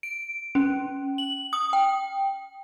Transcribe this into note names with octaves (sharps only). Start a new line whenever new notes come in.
D7
C#4
F#7
D#6
G5